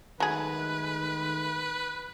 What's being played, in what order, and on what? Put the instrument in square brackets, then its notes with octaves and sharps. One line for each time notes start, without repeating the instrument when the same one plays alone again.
[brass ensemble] D#3 G#3 A3 [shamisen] F#3 G#4 [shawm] B4